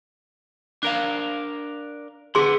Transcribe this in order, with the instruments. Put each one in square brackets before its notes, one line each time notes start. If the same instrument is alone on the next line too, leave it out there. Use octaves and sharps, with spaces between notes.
[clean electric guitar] D4 A#4 F5
[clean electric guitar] D3 B3 [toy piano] G#4 C6